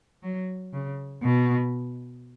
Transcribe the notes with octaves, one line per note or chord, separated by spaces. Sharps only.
F#3
C#3
B2